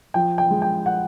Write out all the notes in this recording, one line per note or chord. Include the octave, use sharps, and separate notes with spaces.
F3 G5
G5
G#3
G5
F#5